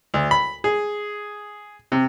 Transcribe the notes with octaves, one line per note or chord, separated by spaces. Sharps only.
D2
B5
G#4
C3